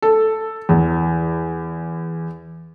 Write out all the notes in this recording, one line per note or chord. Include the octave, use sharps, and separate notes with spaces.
A4
E2